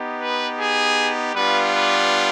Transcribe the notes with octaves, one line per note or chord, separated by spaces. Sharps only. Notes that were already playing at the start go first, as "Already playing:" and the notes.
Already playing: B3 D#4 G4
B4
G#4
G3 B3 D4 F4 B4
B4